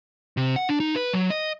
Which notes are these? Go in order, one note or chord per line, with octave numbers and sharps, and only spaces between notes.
C3
F#5
D4
D#4
B4
F#3
D#5